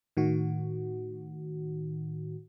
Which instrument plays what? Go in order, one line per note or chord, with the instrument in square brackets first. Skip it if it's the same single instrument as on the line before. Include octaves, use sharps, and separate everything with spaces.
[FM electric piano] A2 D#3 F#4